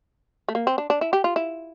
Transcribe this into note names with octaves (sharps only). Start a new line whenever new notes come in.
A3
A#3
C4
D4
D4
E4
G4
F4
E4